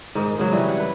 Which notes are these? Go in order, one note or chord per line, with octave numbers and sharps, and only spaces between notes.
G#2 D#3
G#2 C#3 F#3
C3 E3 G3 C#4
F#5
B4